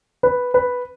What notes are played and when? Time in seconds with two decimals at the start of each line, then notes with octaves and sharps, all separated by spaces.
0.23 B4
0.54 B4